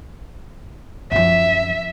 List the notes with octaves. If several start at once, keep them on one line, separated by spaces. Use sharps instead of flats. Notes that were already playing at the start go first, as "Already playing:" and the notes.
F#2 F3 E5